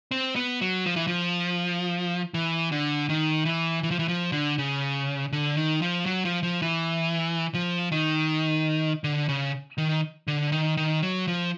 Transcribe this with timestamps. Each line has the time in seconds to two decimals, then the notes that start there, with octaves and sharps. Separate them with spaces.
0.11 C4
0.36 B3
0.61 F#3
0.86 F3
0.96 E3
1.07 F3
2.34 E3
2.72 D3
3.09 D#3
3.45 E3
3.83 E3
3.91 F3
3.99 E3
4.08 F3
4.32 D3
4.58 C#3
5.32 D3
5.56 D#3
5.82 F3
6.06 F#3
6.25 F3
6.43 F3
6.62 E3
7.54 F3
7.92 D#3
9.04 D3
9.29 C#3
9.78 D#3
10.27 D3
10.52 D#3
10.77 D#3
11.02 F#3
11.27 F3